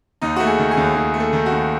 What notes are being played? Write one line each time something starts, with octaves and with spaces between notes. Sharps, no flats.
D#2 D#4
A3 F#4
G#4
D#3
G#4
D#2
D#2 G#4
A3
A4
D#3
F#4
D#2